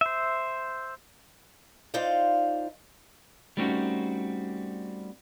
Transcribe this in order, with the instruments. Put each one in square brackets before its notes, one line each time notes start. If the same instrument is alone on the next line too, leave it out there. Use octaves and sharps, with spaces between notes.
[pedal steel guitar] C5 E5
[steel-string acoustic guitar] D#4 F4 C5 D5 F5
[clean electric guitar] G3 A3 C4 C#4 D#4 F#4